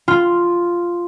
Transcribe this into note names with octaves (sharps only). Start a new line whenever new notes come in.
F4